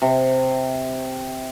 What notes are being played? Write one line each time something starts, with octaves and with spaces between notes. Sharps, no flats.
C3